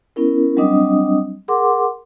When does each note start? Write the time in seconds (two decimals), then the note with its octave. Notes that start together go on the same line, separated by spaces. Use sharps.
0.16 B3 C#4 E4 A#4
0.57 F#3 G3 C4 D4 D#5 D#6
1.48 G#4 A#4 F#5 C6 D6